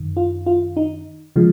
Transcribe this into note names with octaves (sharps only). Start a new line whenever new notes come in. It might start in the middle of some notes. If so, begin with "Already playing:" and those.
Already playing: F#2 D#3
F4
F4
D#4
C#3 F3 G#3